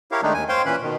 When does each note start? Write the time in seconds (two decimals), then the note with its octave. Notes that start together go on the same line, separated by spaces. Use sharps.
0.12 E4 G4 A#4 C#5 F5
0.23 D#3 G#3 A3 D4 D#4
0.34 D#2 G#5
0.49 C5 C#5 F5 G5 C6
0.65 A#2 E3 C#4 B4 B5
0.83 B2 D#3